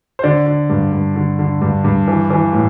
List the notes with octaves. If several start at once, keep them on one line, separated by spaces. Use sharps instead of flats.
C5
D3 D5
D3
G2
G2
D3
D3
G2
G2
E3
E3
A2